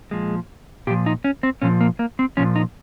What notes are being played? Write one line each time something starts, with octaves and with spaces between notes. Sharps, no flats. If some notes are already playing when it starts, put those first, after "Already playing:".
A#2 F3 G#3
A#2 F3 G4
D#4
C#4
C4
A#2 F3 C#4
A#3
A#3
C4
A#2 F3 C#4
D#4